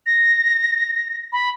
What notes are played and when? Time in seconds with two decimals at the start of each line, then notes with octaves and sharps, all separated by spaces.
0.06 A#6
1.32 B5